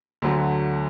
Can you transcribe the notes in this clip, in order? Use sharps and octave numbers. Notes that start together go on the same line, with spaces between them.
D2 D3 F#3 A3